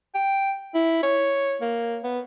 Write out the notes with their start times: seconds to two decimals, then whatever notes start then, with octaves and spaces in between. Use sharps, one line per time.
0.15 G5
0.75 E4
1.03 C#5
1.61 A#3
2.04 B3